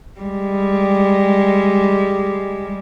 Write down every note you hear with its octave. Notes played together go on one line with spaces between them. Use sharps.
G3 G#3